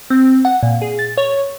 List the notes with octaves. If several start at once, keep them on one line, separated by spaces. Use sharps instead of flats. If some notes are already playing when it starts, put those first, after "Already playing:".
C4
F#5
A#2
G#4
A6
C#5